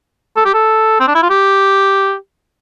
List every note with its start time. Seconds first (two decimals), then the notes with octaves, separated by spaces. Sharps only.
0.36 A4
0.45 G4
0.54 A4
1.00 C4
1.08 D4
1.15 E4
1.23 F4
1.30 G4